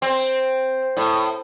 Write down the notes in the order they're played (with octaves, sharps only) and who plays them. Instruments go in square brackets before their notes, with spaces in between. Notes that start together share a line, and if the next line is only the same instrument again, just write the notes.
[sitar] C4
A2